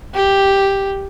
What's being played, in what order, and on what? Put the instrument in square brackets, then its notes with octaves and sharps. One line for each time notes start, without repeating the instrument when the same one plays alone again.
[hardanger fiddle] G4